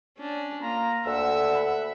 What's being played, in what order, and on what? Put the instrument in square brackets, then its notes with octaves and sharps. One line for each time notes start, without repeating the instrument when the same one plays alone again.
[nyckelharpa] C#4 D4
[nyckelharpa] A#3 [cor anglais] F4 [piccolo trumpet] A#5
[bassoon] D2 [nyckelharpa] E5 [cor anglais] F#5 [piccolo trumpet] E6
[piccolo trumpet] B5